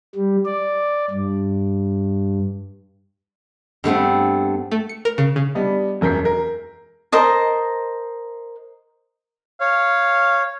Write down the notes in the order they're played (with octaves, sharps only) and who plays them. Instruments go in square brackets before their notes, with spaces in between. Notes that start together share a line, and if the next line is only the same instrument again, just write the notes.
[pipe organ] G3
D5
G2
[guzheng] G2 A3 B3 C4
[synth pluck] A3
C#7
A#4
C#3
C#3
[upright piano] G3 B3 D4 D#5
E1 F#2 A#4 G6 B6 C7
A#4
[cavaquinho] A#4 C5 D#5 A5
[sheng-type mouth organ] C#5 [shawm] F5